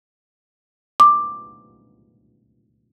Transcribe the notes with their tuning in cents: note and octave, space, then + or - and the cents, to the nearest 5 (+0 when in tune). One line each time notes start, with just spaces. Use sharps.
D6 +10